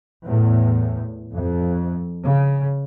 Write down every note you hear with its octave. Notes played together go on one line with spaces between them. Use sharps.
E2 A2
F2
C#3